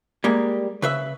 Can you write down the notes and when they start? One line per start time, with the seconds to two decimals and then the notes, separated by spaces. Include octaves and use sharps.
0.24 G3 G#3 A#3
0.82 C#3 B4 E5